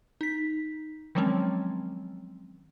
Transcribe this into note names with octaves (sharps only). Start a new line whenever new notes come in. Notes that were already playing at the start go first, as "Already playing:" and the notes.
D#4 B6
D#3 F3 F#3 G#3 C4 C#4